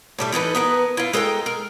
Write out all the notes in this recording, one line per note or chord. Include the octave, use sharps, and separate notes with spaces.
A2 G3 A3
E3 D#4 A4 B4
B3 A#4 B4
E4 F4
G#3 A4 A#4 G5
A#4